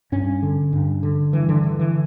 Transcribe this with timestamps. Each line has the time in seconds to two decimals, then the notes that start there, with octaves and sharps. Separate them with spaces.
0.12 G2 C#4
0.43 D3
0.73 G2
1.03 D3
1.33 G2 E3
1.49 D3
1.63 D3 E3
1.79 E3